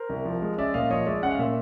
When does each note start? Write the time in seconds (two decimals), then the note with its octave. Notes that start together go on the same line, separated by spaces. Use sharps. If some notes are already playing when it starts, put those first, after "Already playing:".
Already playing: A#4 C5
0.09 C2
0.25 F3
0.42 G#3
0.58 C#4 D5 E5
0.74 A#2 D#5 F5
0.90 F3 C#5 D#5
1.07 G#3 D5 E5
1.22 C#4 F#5
1.31 F5
1.39 A#2 E5